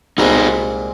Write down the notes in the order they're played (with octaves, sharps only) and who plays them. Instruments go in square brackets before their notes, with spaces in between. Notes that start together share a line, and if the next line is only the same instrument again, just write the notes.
[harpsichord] C2 A#2 G#3 C4 [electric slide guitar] D#4 F#4